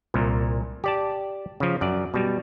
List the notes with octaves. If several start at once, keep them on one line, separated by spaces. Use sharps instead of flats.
C2 A#2
G4 D5 A5
C#3 F3
F#2 D5
B2 G3